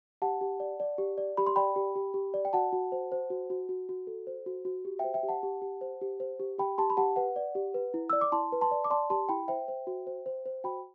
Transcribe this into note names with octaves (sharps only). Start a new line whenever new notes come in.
G4 F#5 A5
G4
D5
D5
G4
D5
G4 B5
C6
D5 G5 B5
G4
G4
G4
D5
G5
F#4 F#5 A5
F#4
C5
C5
F#4
F#4
F#4
F#4
A4
C5
F#4
F#4
G4
C5 E5 G5
E5 G5
G4
F#5 A5
G4
G4
C5
G4
C5
G4
G4 G5 B5
G4 A5 C6
B5
G4 F#5 A5
B4 F#5
D5
G4
B4
E4
D5 E6
D6
E4 A5 C6
B4
A5 C6
D5
D6
D5 A5 C6
G4 A5 C6
E4 G5 B5
C5 E5 G5
C5
F#4
C5
C5
C5
F#4 G5 B5